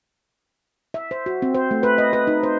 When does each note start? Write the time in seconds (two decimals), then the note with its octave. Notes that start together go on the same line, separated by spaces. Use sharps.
0.94 E5
1.11 C5
1.26 F#4
1.42 C4
1.55 C5
1.71 A3
1.83 B4
1.98 D#5
2.13 B4
2.27 D#4
2.43 C5